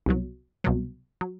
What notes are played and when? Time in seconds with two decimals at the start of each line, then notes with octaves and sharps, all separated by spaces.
0.06 C2 B2 F#3
0.64 C2 B2 F#3
1.21 F#3